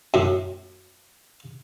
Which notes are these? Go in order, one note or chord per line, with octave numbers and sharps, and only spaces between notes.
F#2 A2